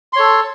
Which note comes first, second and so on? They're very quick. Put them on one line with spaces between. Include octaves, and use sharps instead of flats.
C6 C#5 A4